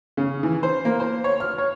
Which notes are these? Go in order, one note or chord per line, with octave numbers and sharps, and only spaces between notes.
C#3
E3
C5
A#3
C5
C#5
F6
C#5